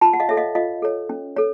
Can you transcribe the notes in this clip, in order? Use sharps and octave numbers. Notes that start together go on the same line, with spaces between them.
F4 A5 B5
F#5
D#5 F5
A4 C#5 E5
D#5 F5
F4 D#5 F5
A4 C#5
C#4
A4 C#5